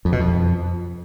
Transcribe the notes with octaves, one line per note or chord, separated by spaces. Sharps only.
F2
B2
F2